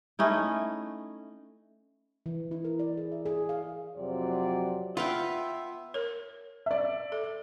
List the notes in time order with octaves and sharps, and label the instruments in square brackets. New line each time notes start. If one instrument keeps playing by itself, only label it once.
[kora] A3 C#4 D#4 E4
[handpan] E3
E4
A#4
D5
G#4
E5
G#4
F5
[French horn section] F2 C3 F#3 C5 D5
[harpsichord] B3 [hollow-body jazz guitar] F4 [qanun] B4 F5 G5 [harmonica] E5
[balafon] A#4 C#5
[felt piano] D5 E5
[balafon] A4